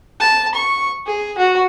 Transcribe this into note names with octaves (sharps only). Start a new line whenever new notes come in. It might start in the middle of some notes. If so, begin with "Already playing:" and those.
A5
C#6
G#4
F#4